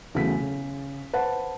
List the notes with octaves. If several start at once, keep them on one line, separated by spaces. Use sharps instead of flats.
E2 C#3 F#3 A3 B6
C#3
B4 C5 F#5 A5